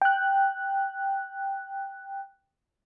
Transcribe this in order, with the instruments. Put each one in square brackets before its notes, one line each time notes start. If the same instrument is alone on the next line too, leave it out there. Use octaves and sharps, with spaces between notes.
[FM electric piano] G5 F#6